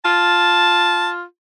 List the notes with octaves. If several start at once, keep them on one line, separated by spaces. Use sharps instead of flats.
F4 A5